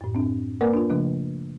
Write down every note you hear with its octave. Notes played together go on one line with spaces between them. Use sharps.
F#2 A2
C4 D4
A#3 A#4 B4 D5 F#5
D4 F4
C#3 F3 A3 D4